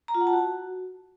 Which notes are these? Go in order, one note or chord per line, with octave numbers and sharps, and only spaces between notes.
A#5
F4
F#5
A5
F#4